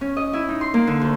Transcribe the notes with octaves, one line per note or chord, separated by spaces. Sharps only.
C#4
D#5
E4
D#4
C6
A#3
D3
D2